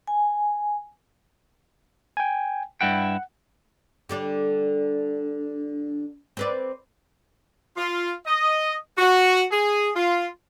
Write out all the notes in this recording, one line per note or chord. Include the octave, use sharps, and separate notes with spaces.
G#5
G5 G#5
G2 E4 F#5 G5
D3 G3 D4
C4 B4 D5
F4
D#5
F#4
G#4
F4